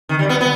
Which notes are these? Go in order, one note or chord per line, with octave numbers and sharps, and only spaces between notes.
D#3
G3
B3
B3